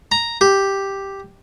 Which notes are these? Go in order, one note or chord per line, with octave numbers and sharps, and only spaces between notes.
A#5
G4